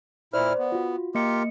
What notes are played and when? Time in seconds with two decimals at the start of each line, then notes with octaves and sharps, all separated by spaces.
0.33 A#2 E4 C5 D5 F6
0.59 B3
0.72 F4 F#4
1.15 A#3 F4 G4 A#4 D#5 C#7